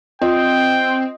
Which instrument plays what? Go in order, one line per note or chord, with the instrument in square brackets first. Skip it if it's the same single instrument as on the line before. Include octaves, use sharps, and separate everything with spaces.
[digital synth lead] C4 [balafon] F4 [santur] D#5 [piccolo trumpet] G5